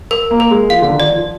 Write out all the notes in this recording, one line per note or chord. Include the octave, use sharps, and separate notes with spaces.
A#4
A#3
A#4
G#3
F3 F5
D3
D#3
D5
F3